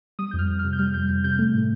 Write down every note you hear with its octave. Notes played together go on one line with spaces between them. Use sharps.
G3 D#6
F2 G6
F6
F2
F6
C3
G6
G3 F6
F2 G6
F2 G6
C3 G6
A3
A2